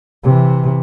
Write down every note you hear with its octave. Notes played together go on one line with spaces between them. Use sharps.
C3 E3